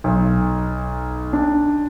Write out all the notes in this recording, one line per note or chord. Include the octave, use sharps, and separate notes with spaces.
B1
D4